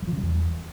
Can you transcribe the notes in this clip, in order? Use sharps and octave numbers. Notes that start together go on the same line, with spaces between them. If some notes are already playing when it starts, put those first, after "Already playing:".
G3
F3
C#3
G3
E2